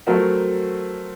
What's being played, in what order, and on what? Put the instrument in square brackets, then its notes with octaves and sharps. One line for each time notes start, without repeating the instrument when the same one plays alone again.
[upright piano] F#3 A3 C4 F#4 A#4